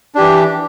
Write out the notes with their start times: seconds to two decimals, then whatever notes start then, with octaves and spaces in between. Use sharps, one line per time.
0.15 D4
0.17 G4
0.20 E3